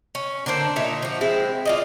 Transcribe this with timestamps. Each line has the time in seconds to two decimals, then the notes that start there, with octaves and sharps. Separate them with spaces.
0.15 C#4
0.46 D3 A#3 D4 C5
0.76 A#2 D#4 C#5 E5
1.02 F3 F#4
1.21 G#3 C4 E4
1.65 F4 D5 D#5